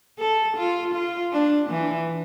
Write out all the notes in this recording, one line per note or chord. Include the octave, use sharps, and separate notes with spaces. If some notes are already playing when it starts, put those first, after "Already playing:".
A4
F4
F4
D4
E3